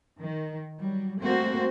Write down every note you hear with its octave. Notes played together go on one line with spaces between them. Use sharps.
D#3
F#3 G3
G3 A3 A#3 C4 F#4 C5